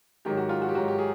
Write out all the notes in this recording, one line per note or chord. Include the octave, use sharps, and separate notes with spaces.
G#2 D#3 F#3 G4
F#4
F4
F#4
G4
G#2 D#3 F#3 F#4
G4
G#4